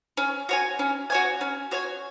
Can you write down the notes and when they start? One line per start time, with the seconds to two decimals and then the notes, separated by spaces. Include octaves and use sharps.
0.17 C#4
0.49 F#4 C#5 G#5
0.79 C#4
1.10 F#4 C#5 G#5
1.41 C#4
1.71 F#4 C#5 G#5